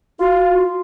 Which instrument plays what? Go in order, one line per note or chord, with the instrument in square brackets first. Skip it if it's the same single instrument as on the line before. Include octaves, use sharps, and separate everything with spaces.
[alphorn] F4 [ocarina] F#4